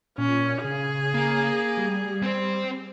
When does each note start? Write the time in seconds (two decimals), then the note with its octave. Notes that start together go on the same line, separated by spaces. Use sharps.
0.18 A#2 C#4
0.64 C#3 G#4
1.15 A#3
1.77 G3
2.23 C4 C5